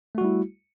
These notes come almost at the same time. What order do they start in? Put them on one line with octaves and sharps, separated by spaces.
A3 F#4 G3 E4